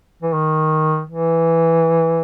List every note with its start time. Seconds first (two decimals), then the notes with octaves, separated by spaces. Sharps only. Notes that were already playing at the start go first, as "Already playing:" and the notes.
0.22 E3
0.33 D#3
1.10 E3